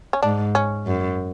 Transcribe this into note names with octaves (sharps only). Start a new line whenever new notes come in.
C#4
G#2 D4
C#4
F#2